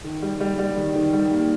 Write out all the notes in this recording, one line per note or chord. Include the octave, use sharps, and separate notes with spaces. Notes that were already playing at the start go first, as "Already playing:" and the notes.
D#3
G3
G3
G3
D#3
D#3
G3
A#3